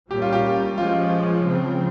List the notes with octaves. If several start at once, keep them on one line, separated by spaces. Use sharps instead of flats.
A#2 G3 A#3 C#4 G4
F4
G4
F3 G#3 C#4 F4
C#3 F3 C4